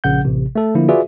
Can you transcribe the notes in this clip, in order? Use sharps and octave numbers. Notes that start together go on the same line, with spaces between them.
A#1 C#3 F#5 G6
A1 C3
A3 A4
D3 F3 A#3 E4
F4 F#4 G#4 B4 D5 E5